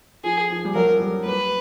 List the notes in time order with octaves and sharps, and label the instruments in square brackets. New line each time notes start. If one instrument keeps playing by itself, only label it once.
[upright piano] F3 [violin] G#4
[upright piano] F3
G3
[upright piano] F#3 [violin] A#4
[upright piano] G3
[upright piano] G3 [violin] B4